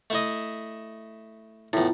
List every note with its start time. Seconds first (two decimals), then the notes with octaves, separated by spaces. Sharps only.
0.10 A3 E4 D#5
1.73 E2 A2 E4 F4